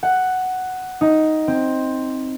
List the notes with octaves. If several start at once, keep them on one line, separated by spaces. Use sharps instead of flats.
F#5
D#4
C4